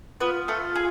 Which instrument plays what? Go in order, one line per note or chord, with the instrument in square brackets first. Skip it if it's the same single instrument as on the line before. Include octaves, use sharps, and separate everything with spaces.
[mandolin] B3 B4 [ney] F4
[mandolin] A3 A4
G#4